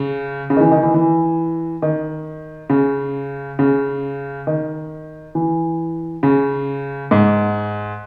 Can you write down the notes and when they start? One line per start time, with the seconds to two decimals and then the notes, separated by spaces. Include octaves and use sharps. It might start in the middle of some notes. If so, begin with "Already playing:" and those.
Already playing: C#3
0.50 C#3
0.56 D#3
0.61 E3
0.71 D#3
0.83 E3
0.94 E3
1.82 D#3
2.70 C#3
3.59 C#3
4.47 D#3
5.35 E3
6.23 C#3
7.11 G#2